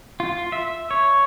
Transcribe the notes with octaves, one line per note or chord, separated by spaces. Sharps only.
F4
E5
C#5